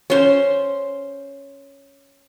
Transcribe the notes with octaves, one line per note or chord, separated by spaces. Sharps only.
C#4 C5